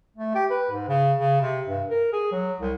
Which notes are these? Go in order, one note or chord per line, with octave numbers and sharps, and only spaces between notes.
A3
G4
B4
G#2
C#3
C#3
C3
G2
A#4
G#4
F#3
C2